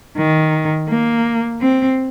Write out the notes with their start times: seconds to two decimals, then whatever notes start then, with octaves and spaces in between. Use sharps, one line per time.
0.17 D#3
0.89 A#3
1.61 C4